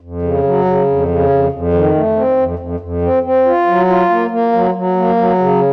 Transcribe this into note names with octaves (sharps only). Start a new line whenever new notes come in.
F2
C#3
F#3
C#3
F2
C#3
F2
F2
D#3
A3
C4
F2
F2
F2
C4
C4
F4
F#3
F4
A#3
A#3
F#3
F#3
A#3
F#3
C#3